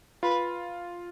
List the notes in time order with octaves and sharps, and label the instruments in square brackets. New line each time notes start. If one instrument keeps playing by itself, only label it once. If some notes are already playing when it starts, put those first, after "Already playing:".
[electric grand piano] F4 [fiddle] B4